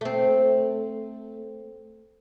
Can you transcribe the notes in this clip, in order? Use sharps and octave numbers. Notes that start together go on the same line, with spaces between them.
A3 C4